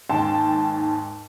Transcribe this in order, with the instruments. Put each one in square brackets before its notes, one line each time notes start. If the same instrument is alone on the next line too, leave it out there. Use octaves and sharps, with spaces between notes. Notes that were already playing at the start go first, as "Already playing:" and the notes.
[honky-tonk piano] D#2 G#2 G5 A5 C6 E7